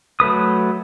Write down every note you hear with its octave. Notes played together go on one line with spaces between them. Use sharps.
F#3 A3 B4 D#6